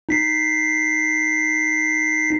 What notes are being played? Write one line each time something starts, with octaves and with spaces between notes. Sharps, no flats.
D#4 B6 C7